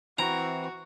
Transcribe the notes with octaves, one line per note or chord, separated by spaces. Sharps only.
E3 C4 E4 F#4 A#5